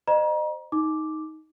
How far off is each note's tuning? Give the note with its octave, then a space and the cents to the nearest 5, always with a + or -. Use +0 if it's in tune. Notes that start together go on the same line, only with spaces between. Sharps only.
C5 +0 D#5 -30 A#5 +35
D#4 +10 D6 +0